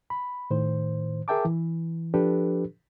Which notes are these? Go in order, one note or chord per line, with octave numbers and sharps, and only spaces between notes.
B5
A2 D#3 C5
G#4 A#4 E5 G5 A5 D6
E3
F3 D4 G4 A4 B4